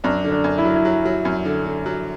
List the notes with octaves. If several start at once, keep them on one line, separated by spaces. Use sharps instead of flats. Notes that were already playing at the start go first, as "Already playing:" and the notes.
F#2 D4
D3
D4
F#2
E4
F#3
E4
F#3
F#3
F#2
D3
D3
F#3